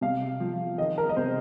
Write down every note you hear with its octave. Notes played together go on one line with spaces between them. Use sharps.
C3 F5
F3
D#3 D#5
A#4
D#5
C3 C5